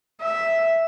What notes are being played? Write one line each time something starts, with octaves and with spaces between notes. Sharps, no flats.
E5